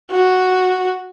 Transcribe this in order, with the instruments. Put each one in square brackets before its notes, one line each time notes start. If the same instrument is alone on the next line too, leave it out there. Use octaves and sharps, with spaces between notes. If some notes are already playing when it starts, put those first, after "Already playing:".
[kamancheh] F#4